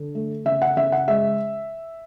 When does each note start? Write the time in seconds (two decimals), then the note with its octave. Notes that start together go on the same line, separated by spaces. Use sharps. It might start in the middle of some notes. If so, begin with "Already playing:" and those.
Already playing: D3
0.15 A3
0.45 C#3 E5
0.62 F#5
0.77 C#3 E5
0.92 F#5
1.08 G#3 E5